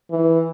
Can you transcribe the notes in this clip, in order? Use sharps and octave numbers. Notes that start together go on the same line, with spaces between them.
E3